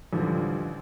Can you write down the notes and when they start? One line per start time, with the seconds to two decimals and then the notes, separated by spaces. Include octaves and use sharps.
0.13 A1 D3 F3 G3